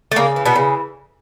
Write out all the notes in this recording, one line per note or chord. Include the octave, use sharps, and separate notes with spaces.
A3
C#3 A#3
E3
B2 B3
C#3